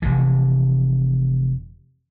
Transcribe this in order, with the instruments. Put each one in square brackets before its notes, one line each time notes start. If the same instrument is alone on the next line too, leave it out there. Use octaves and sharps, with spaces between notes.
[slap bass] F1 C3 E3